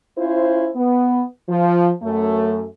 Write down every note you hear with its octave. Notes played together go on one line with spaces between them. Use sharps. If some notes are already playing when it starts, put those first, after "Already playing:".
C#4 E4 F4 C5
B3
F3
F#2 A3